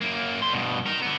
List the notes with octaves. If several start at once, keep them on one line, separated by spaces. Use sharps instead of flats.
F#2 A#3
G3 C6
G2 B2
D#4 A#4
D3 B3